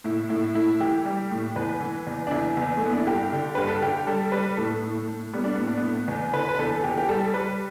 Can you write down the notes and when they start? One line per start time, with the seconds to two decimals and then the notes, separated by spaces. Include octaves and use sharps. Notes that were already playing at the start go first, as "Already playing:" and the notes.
0.04 A2 E4
0.29 A2 E4
0.55 A2 E4
0.80 E3 G4
1.05 G3
1.31 A2
1.56 E2 B4
1.80 E3
2.07 E2
2.27 D4
2.31 E2 E4
2.57 E2
2.77 A3
2.82 E3 B3
2.93 D4
3.00 E4
3.06 G2 G4
3.32 D3
3.55 G2 B4
3.68 A4
3.82 D3 G4
4.07 G3 A4
4.32 G3 B4
4.57 A2 A4
4.83 A2
5.07 A2
5.33 G3 B3
5.44 D4
5.55 A2 B3
5.67 D4
5.78 B3
5.83 A2
6.08 E2
6.33 D3 B4
6.49 B4
6.59 E2 A4
6.84 E2 G4
6.98 G4
7.09 G3 A4
7.34 G3 B4